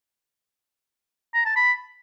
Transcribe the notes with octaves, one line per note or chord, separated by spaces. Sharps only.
A#5
A5
B5